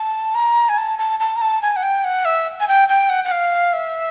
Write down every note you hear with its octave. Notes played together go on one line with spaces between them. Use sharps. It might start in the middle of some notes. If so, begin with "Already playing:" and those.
Already playing: A5
A#5
G#5
A5
A5
A5
A#5
A5
G#5
F#5
G5
F#5
E5
G#5
G5
G5
F#5
F#5
F5
E5